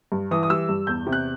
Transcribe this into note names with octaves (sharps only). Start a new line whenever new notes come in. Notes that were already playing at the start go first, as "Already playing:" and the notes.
G2
E3 D#6
D#6
G3 E6
G2
E2 G6
C3
F#6